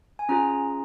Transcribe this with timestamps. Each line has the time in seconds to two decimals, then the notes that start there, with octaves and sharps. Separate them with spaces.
0.19 G#5
0.29 C#4 F4 G#4 A#5